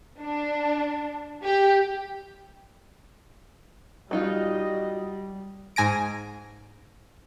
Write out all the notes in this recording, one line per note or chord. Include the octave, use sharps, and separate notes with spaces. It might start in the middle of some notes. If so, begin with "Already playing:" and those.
D4
G4
F#3 G3 D#4 F4 F#4 D#5
G#2 G#5 A#6 D7